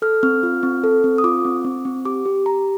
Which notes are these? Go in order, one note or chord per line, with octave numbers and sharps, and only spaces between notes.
A4 F6
C4 F6
F4
C4
A4
C4
D#6
F4 D6
C4
C4
C4
G4 D6
G4
G4 A#5